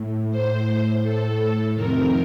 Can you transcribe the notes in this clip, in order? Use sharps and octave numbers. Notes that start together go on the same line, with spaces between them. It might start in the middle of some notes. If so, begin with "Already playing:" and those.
Already playing: A2
A2 C5
A2 A4
F2 C3 D#3 A#4